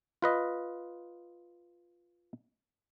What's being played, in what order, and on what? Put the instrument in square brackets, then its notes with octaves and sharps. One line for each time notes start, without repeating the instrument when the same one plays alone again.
[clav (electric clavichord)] F4 B4 D#5